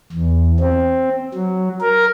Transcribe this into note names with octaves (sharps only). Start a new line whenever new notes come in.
E2
C4
F#3
A#4